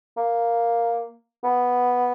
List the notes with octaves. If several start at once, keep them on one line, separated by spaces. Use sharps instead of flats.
A#3
B3